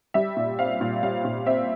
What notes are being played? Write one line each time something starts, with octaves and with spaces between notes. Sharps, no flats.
G3 E5
A#2
C4 F5
A#2
G3 F5
A#2
C4 E5